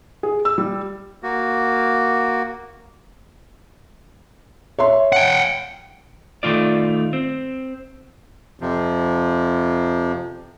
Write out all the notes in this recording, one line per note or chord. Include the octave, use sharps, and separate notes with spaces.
G#4
E6
G3
A#3 F#4
C#5 E5 C6
F#5 G5
D#3 A3 F4 D5
C4
F2 C3 F3